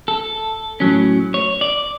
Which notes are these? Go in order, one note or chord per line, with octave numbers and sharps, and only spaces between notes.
A4
A2 F#3 C#4
C#5
D5